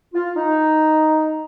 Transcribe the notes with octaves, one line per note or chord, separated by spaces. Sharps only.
F4
D#4